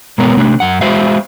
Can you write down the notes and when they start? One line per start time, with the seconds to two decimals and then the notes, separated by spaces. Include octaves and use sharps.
0.18 B2 G#3 B3 A#4 C#5
0.37 C3 A3 D4
0.60 F#2 F#5
0.81 G#3 F#4 C5 E5 F5